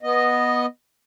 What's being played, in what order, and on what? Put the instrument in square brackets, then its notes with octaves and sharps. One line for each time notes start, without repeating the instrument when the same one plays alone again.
[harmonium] B3 D#5